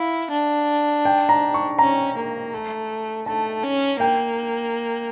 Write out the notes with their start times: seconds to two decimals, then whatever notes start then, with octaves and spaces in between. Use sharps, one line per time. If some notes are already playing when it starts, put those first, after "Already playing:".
Already playing: E4 F5
0.31 D4
1.05 G5
1.29 A#5
1.54 C#6
1.79 C#4 A#5
2.16 A#3
2.53 A3
3.26 A3 A5
3.63 C#4
4.00 A#3 G5